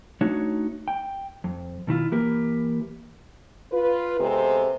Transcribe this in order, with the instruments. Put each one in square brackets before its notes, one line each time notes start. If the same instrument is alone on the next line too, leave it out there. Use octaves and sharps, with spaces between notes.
[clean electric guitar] A3 D4 D#4 F#4 C#5
G5
F2
B2 D#3 E4 F4
E3 A#3 G4 A#4 B4
[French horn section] F4 B4
C3 G#3 B3 C4 A4